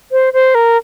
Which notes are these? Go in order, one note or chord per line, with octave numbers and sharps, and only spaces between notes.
C5
C5
A#4